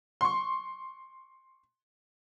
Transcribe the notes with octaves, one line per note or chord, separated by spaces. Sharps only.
C6 C#6